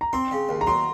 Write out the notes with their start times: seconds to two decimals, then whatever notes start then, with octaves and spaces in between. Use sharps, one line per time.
0.01 A#5
0.13 C4 C6
0.31 C#3
0.49 D#2
0.61 A#5
0.67 F#3 C6